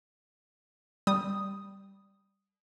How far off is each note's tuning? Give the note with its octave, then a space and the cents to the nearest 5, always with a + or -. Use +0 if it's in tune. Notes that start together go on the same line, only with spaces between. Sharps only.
G3 +0 D#6 +0